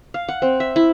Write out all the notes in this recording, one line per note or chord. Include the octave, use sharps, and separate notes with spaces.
F5
F#5
C4
E5
E4